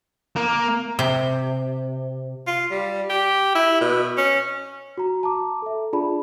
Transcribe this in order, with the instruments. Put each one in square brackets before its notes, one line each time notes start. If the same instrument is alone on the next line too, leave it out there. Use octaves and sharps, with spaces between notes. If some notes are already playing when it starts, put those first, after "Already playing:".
[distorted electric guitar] A#3
[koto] C3
[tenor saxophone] F4
G3
G4
E4
B2
C#4
[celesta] F#4 A#5
A5 A#5 D6
A4 E5
D4 F4 G#4 D5 A5 B5